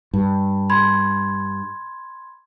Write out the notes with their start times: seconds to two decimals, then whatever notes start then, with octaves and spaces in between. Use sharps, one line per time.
0.13 G2
0.70 B5 C6 G#6